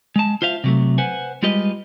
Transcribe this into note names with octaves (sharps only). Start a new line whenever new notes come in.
G#3 A5
F4 C5 E5 F5
C3 F#3 A3
B4 C5 F#5 G#5
G3 G#3 F4 G4 B4 D#5